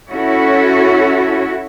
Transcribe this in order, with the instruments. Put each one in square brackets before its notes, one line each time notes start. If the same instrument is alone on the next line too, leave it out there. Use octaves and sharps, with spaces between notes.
[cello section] C#4 E4 F#4 A4 C#5